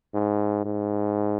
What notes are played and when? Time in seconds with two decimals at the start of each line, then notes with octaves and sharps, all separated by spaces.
0.14 G#2
0.65 G#2